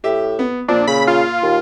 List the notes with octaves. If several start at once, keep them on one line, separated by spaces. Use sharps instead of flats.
A2 G4 E5
B3
A#2 F3 D4
C#3 B5
F4
D#2